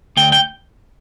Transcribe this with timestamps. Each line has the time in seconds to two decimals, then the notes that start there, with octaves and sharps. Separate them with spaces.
0.17 D2 G5
0.32 G5